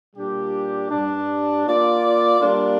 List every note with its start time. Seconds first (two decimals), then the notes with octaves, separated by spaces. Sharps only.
0.15 A#2 G3 D4 G4
0.90 G2 G3 D4
1.65 A#3 F4 D5
2.39 G3 A#3 D4 F4